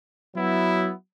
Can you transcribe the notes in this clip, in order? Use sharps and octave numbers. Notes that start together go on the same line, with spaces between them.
F#3 B3 E4